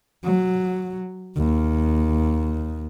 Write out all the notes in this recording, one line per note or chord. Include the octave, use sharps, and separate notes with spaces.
F#3
D#2